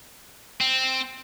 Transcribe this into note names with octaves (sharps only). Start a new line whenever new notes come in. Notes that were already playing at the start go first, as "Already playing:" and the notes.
C4